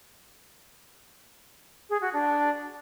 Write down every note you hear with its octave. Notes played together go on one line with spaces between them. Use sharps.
G#4
F#4
D4